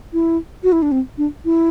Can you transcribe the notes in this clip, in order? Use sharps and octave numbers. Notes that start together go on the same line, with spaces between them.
E4
F#4
E4
D4
C4
D4
E4